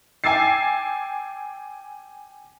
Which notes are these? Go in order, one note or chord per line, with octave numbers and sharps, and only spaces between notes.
G5 G#5 D6 E6 A6 C7